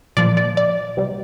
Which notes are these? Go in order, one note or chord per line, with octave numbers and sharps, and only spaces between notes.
A#2 F3 D5
D5
D5
C3 G3